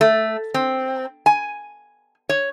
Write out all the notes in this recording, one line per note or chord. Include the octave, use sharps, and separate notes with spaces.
A3
C4
G#5
C#5